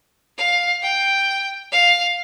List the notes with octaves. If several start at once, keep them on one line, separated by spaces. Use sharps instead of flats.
F5
G5
F5